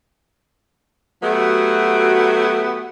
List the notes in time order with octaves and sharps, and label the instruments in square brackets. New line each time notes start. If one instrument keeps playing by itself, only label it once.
[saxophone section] F#3 A3 B3 F#4 G4